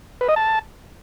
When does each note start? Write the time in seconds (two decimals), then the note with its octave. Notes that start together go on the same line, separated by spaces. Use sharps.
0.21 B4
0.29 D#5
0.36 A5